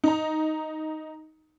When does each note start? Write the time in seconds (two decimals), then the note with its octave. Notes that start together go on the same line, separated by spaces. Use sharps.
0.04 D#4 A#5